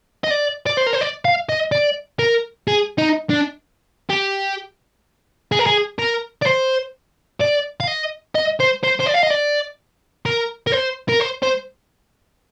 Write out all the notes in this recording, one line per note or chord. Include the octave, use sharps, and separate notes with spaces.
D#5
D5
D5
C5
A#4
C5
D5
F5
D#5
D5
A#4
G#4
D#4
D4
G4
G#4
A#4
G#4
A#4
D5
C5
D5
F5
D#5
D#5
C5
C5
C5
D5
F5
D#5
D5
A#4
A#4
C5
A#4
C5
C5